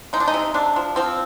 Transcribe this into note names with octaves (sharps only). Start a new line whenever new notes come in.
G#3 D#4
D4
D#4
C3
C3 D4
F3
F3 C4